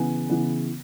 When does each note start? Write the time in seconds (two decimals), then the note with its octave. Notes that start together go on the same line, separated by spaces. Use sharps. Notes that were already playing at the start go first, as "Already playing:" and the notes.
Already playing: C#3 E3 B3 G#5
0.30 C#3 E3 B3